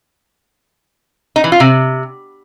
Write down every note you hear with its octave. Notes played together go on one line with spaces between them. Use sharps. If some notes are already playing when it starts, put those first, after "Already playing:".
D#4
E3
F4
C3